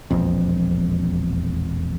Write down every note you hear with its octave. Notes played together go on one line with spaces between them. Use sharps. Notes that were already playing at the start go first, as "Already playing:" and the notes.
E1 A#1 F2